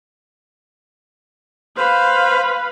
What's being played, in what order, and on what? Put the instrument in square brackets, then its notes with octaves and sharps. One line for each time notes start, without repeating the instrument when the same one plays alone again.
[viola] B4 F5 [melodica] C5